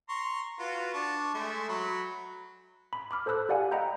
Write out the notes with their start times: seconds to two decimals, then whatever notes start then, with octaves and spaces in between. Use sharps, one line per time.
0.09 A#5 C6 C#6
0.59 F4 F#4 B4
0.94 D4 C#6
1.34 G#3 A3 E5
1.69 F#3 B5
2.93 B5
3.11 B5 D6 F6
3.26 A4 C5 A5 E6 F#6
3.49 G4 D5 F5 F#5 G#5
3.71 D#5 F#5 G5 A#5 B5 G6